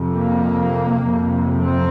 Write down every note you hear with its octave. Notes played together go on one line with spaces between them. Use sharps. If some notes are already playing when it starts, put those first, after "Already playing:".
Already playing: F2 C3
A#3
F2 C3
C4